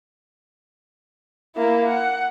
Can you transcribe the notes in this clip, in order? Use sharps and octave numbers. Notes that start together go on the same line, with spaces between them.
A#3 E4
F#5